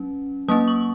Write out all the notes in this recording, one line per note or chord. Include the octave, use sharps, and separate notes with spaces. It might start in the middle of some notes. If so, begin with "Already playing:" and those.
Already playing: F#3 C#4
F#3 A#3 C#4 D#6
C#6